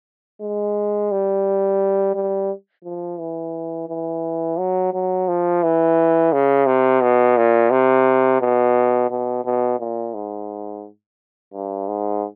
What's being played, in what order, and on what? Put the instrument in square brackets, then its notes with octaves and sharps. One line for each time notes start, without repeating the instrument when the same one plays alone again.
[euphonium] G#3
G3
G3
F3
E3
E3
F#3
F#3
F3
E3
C#3
C3
B2
A#2
C3
B2
B2
B2
A#2
G#2
G2
G#2